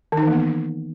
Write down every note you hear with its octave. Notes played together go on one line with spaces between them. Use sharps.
D#3
D#4
E3
A#3
B3